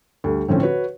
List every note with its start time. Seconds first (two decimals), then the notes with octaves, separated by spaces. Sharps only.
0.24 D2 G3
0.48 A2 D3 F3 C4 C#4
0.61 F#4 B4 C#5